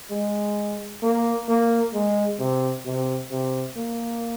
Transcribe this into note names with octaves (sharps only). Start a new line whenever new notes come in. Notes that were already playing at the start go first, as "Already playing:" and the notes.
G#3
A#3
A#3
G#3
C3
C3
C3
A#3